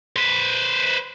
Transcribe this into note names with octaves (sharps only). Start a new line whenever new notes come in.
B4 C5